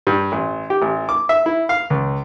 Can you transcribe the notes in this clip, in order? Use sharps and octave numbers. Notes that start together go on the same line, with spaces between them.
G2
A1
G4
A1
D6
E5
E4
F5
C#2